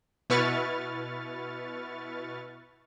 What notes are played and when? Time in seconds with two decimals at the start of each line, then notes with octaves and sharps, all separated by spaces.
0.30 B2 E4 B4 C#6 F6 A6